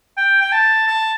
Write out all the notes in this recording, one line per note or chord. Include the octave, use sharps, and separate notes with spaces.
G5
G5
A5
A5